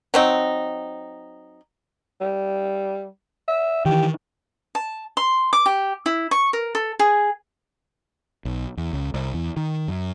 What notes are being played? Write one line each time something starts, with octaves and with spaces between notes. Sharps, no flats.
F#3 C4 D#4
G3
E5
D#3 E3 G4
A5
C6
D6
G4
E4
C#6
A#4
A4
G#4
B1
E2
C#2
C2
E2
D#3
F#2